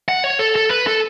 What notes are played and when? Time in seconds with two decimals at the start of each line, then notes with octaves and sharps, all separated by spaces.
0.09 F#5
0.24 C#5
0.39 A4
0.56 A4
0.70 B4
0.87 A4